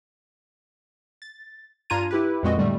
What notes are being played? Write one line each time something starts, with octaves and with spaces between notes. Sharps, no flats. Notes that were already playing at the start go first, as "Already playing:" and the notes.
A6
G2 D4 F4 A#5 G#6 D#7
E4 G4 B4
F2 A#2 G#3 C4 F#4 D#5
A2 D3 G3 A3